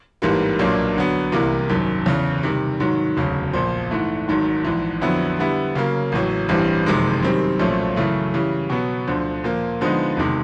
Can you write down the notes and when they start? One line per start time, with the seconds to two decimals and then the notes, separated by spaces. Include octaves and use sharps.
0.22 A1 G#2 E3 G3 A#3
0.59 B1 A#2 F#3 A#3 D4
0.96 D3 F#3 B3
1.32 C2 C3 E3 G3 A#3
1.69 G#1 F#2 D#3
2.06 E2 C#3 E3
2.43 C3 D#3 G3
2.80 G#2 D#3 F#3
3.17 E1 D2 C#3 F#3
3.53 A#1 A#2 F3
3.91 G#2 E3 A3
4.28 G#1 G#2 D#3 F#3
4.64 A#1 G#2 E3
5.01 F2 D3 F#3 B3 E4
5.39 D3 G3 B3 E4
5.75 C#3 F#3 A#3
6.12 A1 A2 F#3
6.49 A1 G2 E3 G3 C4
6.86 F#1 F2 C3 D#3 G#3
7.22 F#2 D#3 G3 C4
7.59 B1 A#2 F3 A3 C#4
7.96 F#2 C#3 E3 A3
8.34 C#3 E3 G3
8.70 B2 F#3 B3
9.07 D2 D3 F3
9.44 A#2 F3 A#3
9.81 D3 F3 G#3 B3 D#4
10.17 E1 C3 D#3 G#3